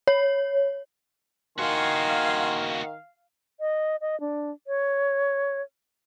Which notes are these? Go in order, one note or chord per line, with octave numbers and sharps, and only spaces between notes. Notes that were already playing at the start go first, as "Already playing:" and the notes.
C#5
D#3 A#3 F#4 F5 G#5 C6
D#5
D#5
D4
C#5